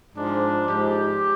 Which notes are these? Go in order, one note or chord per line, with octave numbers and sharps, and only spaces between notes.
G#2 F3 D4
G#2 F3 G4